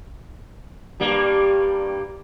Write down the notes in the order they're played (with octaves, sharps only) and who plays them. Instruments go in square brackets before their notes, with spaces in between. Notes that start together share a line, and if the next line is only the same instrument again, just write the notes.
[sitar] G2 G3 A#3